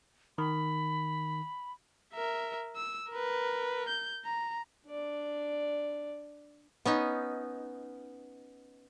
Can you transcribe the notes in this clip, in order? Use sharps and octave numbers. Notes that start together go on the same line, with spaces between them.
D#3 B5
A#4 E5
E6
A#4 B4
G6
A#5
D4 D5
B3 C#4 D#4